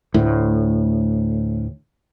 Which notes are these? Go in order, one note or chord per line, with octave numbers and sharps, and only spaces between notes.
D2 A2